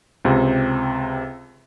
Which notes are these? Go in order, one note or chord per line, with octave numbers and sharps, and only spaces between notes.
C#2 C3 C4